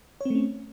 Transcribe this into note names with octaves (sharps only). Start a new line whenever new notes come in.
A3 C4 C#4 C#5